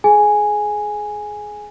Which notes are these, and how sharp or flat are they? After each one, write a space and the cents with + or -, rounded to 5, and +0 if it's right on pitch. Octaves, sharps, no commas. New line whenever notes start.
G#4 +25 G#5 +0